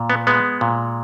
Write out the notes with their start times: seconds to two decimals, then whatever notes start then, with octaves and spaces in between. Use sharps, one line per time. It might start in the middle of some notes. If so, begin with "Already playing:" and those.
Already playing: A#2
0.10 B3
0.27 G#3 B3
0.61 A#2